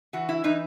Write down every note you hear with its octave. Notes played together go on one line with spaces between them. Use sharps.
E3 F#4
E4
E3 D#4